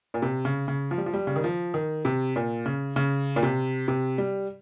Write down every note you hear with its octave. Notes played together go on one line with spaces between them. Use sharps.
A#2
C3
C#3
C#3
F3
G3
F3
G3
C#3
D#3
F3
D#3
C3
A#2
C#3
C#3
A#2
C3
C3
G3